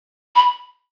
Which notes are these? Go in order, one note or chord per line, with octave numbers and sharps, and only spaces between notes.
B5